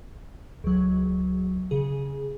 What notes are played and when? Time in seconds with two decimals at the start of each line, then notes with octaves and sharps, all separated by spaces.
0.64 C#2 F#3
1.71 C#3 G#4